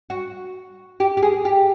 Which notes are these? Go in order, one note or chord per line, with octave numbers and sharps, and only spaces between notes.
F#4
G4
G4
G#4
G4